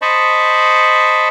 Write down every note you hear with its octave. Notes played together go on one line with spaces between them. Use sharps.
C5 D#5 A5 B5 C#6